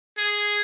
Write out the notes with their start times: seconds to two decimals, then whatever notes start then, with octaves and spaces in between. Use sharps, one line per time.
0.18 G#4